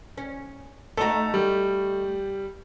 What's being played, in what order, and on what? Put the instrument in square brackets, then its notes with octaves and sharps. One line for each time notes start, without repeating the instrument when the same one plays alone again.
[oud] C#4
[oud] A3 D#4 F#4 [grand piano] A4 A#5
[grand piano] G3